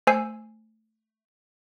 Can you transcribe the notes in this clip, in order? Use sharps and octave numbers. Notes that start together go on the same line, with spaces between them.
A3 C5 G#5 E6 C7